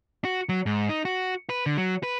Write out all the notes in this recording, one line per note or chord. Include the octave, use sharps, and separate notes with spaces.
F#4
F#3
G#2
D#4
F#4
B4
D3
F#3
B4